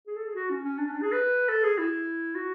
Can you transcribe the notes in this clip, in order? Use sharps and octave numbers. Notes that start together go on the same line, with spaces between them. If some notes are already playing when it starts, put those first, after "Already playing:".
G#4
A4
G#4
F#4
C#4
C#4
D4
C#4
D4
G#4
B4
A4
G#4
E4
F#4